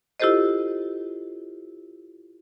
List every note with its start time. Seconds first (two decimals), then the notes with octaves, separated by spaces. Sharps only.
0.20 E4 F4 G4 A4 C5 D#5